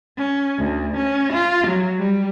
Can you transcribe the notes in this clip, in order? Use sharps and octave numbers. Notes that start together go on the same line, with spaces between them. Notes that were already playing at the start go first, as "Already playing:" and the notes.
C#4
D2
C#4
F4
F#3
G3